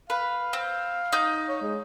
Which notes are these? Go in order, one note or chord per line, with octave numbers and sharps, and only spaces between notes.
B4 F5
C4
D#4 G6
C#5
G#3